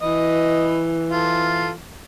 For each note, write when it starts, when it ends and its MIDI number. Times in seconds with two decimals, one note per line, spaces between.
0.02 1.81 52
0.02 0.80 71
0.02 0.80 75
1.12 1.70 65
1.12 1.70 69